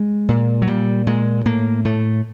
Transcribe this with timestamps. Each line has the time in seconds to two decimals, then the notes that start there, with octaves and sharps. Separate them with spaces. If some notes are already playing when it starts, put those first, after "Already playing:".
Already playing: G#3
0.29 A#2
0.62 F#3
0.67 A#2 G3
1.07 A#2 G#3
1.46 A2 A#3
1.85 A2 A3